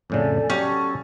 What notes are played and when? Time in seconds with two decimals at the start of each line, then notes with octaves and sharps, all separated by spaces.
0.10 F2 A2 C#3 A4 D5 G#5
0.50 F#3 C#4 G4 A4